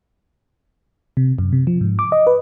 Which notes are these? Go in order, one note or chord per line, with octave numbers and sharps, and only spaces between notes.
C3
F#2
C3
F3
G#2
D6
D#5
B4